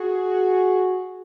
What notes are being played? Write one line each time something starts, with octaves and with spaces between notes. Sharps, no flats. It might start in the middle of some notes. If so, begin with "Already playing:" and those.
Already playing: F#4 G#4